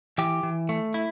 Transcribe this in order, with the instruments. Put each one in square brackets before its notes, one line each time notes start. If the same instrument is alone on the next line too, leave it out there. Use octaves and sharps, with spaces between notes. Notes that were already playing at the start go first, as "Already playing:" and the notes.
[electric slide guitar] E3 G4
E3
A3
E4